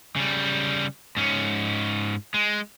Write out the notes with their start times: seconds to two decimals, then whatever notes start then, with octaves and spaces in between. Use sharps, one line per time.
0.16 C#3 G3
1.17 G#2 C#4
2.34 G#3